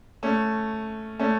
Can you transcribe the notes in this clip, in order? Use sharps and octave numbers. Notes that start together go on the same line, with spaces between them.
A3 C#4
A3 C#4